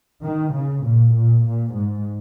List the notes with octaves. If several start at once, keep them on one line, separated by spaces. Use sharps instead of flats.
D#3
C#3
A#2
A#2
A#2
G#2